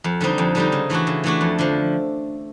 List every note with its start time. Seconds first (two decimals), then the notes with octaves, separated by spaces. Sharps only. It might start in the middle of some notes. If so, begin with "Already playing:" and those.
0.04 F2
0.21 D3 G3 C4 D#4
0.38 F2
0.55 D3 G3 C4 D#4
0.72 C#3
0.90 E3 A3 D4 F#4
1.07 C#3
1.24 E3 A3 D4 F#4
1.41 F2
1.59 D3 F3